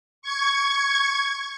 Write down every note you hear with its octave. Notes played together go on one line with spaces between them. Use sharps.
C#6 G#6